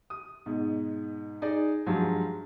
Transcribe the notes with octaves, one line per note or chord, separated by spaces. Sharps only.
D#6
G#2 B2
D#4 G#4 D5
G2 F3 F#3 G#3